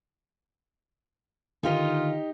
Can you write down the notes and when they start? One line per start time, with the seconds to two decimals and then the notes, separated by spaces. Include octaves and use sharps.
1.63 D3 D#3 D#4 F4 G4 D#5